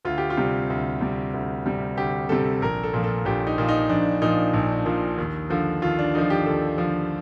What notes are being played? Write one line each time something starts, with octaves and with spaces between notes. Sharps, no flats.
D2 F4
G4
F4
C3 G3
D2
C3 G3
D2
C3 G3
D2 G4
C3 G3 A4
A#1 A#4
A4
A#2 F3
A4
A#1 G4
D#4
A#2 F3
D#4
A#1 D4
A#2 F3 D#4
A#1
A#2 F3
D#2
D3 F3
D#2 F4
D4
D3 F3 D#4
G4
D#2 A4
D3 F3